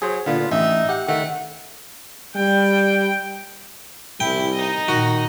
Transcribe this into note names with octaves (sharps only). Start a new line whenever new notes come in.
F#3 G#4 C5
A#2 D3 B3 F4
A1 D#4 E5
G4 F#5
D#3 A3 F#5
G3 G5
C2 E4 G5
D#4 D#5
A#2 D#3 F#4